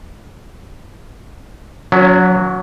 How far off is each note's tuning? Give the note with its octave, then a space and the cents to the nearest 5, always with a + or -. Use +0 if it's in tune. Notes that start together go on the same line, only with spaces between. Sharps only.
F#3 -10 C#4 +40